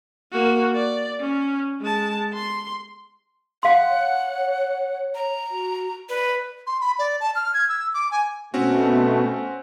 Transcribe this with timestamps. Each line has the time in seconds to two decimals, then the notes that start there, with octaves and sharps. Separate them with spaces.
0.32 A#3 F#4
0.75 D5
1.20 C#4
1.81 G#3 A5
2.33 C6
3.63 F5 F#5 C6
3.89 C#5
5.15 A#5
5.50 F#4
6.09 B4 D5
6.67 C6
6.81 B5
6.99 D5
7.20 A5
7.36 F6
7.54 G#6
7.69 E6
7.94 D6
8.11 G#5
8.54 B2 A3 C4 C#4 F#4